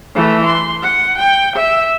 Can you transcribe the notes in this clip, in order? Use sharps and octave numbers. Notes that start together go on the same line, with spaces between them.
E3 A3
C6
F#5
G5
E5